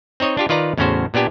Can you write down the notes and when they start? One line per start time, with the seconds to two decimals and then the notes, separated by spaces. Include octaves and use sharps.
0.20 C4 D#4 C#5 D#5
0.37 D4 F4 G4
0.49 D#3 F4 B4 D5 A#5
0.78 E2 A2 C#3 C#4 F#4 C5
1.14 A#2 B3 D4 G4 G#5